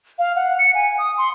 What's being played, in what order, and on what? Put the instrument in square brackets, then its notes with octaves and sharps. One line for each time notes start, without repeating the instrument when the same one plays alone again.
[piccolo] F5
F#5
C#7
G#5
D#6
C6